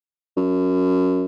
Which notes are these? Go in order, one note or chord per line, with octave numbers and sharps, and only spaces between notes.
F#2